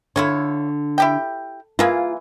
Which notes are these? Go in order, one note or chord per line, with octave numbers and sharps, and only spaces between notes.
D3 E4 F4 C#5
E4 G4 G5
E3 A#3 F4 G#4